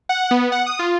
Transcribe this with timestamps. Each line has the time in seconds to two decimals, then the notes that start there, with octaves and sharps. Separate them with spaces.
0.09 F#5
0.31 B3
0.52 F#5
0.66 D#6
0.79 F4